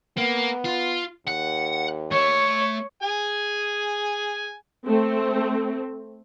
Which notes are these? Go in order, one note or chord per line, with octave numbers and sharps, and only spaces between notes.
A#3 B3
F4
D#2 F#5
A3 C#5
G#4 G#5
A3 C4